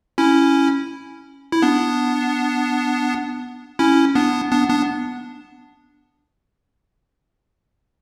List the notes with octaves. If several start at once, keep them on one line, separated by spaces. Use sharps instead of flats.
C#4 E4
E4
B3 D4
C#4 E4
B3 D4
B3 D4
B3 D4